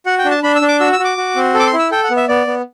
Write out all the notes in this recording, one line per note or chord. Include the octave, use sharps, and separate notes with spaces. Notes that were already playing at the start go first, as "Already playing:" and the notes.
F#4 F#5
G5
D4
A5
D4 B5
E6
D4
D6
F#4 E6
E6
F#4
D6
F#4
C4
A4
D6
C6
E4
E6
A4 G5
F#5
B3
E5
B3 D5
B3